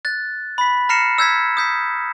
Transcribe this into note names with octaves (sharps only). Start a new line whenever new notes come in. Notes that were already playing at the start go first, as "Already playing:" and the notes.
F#6 A6
B5 B6
A#5 F6 A#6 C7 C#7 E7
E6 G6 G#6 B6
D#6 G6 B6